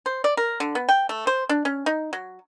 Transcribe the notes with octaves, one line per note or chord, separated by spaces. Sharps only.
C5
D5
A#4
D3
B3
G5
A3
C5
D4
C#4
D#4
F#3